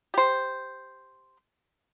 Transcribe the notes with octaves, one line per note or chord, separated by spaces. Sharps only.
G4 C5